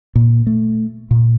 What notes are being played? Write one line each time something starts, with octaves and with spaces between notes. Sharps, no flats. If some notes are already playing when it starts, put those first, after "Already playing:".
A#2
A3
A#2